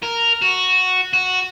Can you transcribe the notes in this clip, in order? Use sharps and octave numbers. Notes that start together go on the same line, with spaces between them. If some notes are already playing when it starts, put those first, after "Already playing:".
A#4
F#4
F#4